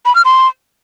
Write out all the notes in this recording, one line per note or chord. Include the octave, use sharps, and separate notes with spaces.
B5
F6
C6